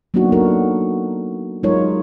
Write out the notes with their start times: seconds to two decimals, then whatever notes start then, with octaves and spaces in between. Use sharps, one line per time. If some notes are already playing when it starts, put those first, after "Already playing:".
0.14 F#3 A#3 B3 D4 D#4 F#4
0.32 D4 D#4 F#4 A4 A#4
1.63 F#3 G#3 D#4 F4 A#4 C#5